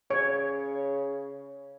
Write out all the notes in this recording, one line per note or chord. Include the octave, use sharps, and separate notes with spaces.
C#3 C#5